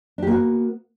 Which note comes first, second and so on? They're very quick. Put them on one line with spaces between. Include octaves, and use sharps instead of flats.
D4 G4 A#3 F#4 B3